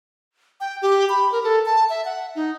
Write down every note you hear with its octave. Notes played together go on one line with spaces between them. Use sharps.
G5
G4
B5
A#4
A4
A5
E5
F#5
D#4